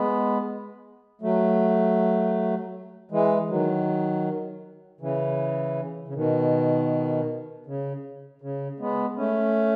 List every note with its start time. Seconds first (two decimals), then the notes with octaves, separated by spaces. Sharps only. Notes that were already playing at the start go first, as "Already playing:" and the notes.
Already playing: G#3 B3
1.21 F#3 A3
3.11 E3 G#3
3.49 D#3 F#3
5.01 C#3 E3
6.08 C#3
6.14 B2 D#3
7.66 C#3
8.42 C#3
8.79 G#3 B3
9.17 A3 C#4